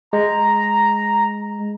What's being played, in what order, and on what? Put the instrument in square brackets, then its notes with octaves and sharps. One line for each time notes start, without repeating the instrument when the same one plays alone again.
[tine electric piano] G#3 [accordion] A#5